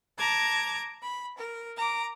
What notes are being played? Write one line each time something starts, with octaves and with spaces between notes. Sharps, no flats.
A5 A#5 D6 G#6
B5
A#4
A#5 D6